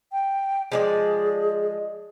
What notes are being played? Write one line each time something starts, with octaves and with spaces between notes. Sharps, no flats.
G5
F3 G#3 G#4 D5